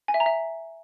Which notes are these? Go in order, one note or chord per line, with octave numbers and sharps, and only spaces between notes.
G#5
E5
A#5
E5